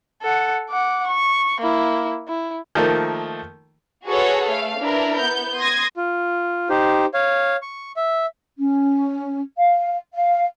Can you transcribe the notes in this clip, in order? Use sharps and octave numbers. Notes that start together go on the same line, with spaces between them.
A4 F#5
F#5 D6
C#6
A#3 E4
E4
D#3 F3 A3 A#3
F#4 G#4 A4 B4 C#5 F#5
A3 F5
D4 E4 A#4 B4
B3 G6
C6 D#6 G#6 A#6
F4
D#4 G4 C5
C#5 F5
C#6
E5
C#4
F5
F5